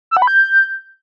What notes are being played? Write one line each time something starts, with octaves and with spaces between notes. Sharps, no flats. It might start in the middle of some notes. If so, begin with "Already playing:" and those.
E6
F#5
B5
G6